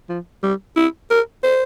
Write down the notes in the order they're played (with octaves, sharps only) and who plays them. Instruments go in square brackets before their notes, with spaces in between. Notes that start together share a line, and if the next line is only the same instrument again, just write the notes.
[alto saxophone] F3
G3
E4
A#4
C5